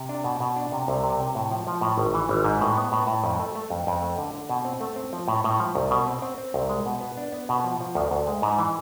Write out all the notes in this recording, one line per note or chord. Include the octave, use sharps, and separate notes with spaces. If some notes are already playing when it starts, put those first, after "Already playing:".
Already playing: C3
D4
B2
B2
D4
C3
C2
C3
C3
A2
F3
F3
A2
G#1
E3
G#1
G#2
A2
B3
A2
A2
F2
A3
A3
F2
F2
A3
D3
D3
B2
C4
A3
C4
F3
A2
A2
F3
C2
B2
C4
C4
C4
C2
G#3
B2
B3
D4
B3
B2
F3
F3
D2
D2
G#3
G#2
E3